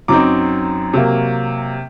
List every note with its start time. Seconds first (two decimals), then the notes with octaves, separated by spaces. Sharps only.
0.08 F#2 F#3 C4 D#4 A#5 D6
0.93 C3 F#3 A#3